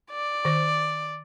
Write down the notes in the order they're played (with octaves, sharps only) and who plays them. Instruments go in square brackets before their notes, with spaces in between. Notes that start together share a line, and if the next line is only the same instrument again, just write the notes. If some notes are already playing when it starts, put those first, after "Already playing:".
[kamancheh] D5
[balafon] D#3 C5